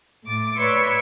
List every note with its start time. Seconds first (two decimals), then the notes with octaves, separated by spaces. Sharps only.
0.24 A2 D6 A6
0.57 B4 C#5 D5 E5 C6 C#6